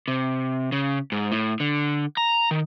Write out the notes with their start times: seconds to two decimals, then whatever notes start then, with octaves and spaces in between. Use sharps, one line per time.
0.08 C3
0.72 C#3
1.12 G#2
1.32 A2
1.60 D3
2.17 A#5
2.51 D#3